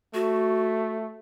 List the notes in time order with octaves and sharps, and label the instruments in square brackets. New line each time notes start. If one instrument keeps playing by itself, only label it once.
[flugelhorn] A3 [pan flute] F#4